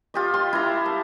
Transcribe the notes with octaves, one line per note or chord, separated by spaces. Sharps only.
F4 G4 D#5
C6
E4 A#5
A5